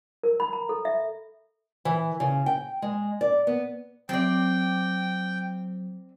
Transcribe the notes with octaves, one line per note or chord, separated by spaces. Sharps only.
A#4
B5
A#5
A4
E5
E3
C#3
G5
G#3
D5
B3
F#3 C4 D5 G5